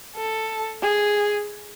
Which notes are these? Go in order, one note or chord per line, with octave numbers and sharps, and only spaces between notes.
A4
G#4